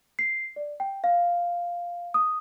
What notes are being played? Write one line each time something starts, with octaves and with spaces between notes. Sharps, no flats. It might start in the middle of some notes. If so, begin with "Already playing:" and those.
C7
D5
G5
F5
D#6